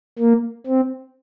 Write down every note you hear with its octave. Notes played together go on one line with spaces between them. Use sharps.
A#3
C4